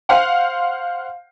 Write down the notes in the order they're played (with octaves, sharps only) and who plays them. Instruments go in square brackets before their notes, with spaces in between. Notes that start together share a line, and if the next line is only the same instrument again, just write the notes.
[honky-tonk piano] C5 F5 F#5